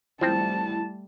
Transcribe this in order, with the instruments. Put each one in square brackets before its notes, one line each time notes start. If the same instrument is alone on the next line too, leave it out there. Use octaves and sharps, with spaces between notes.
[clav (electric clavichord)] F3 C4 [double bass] G3 A3 [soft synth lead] E4 [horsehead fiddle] A5